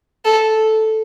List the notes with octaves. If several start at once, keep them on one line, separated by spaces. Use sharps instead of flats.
A4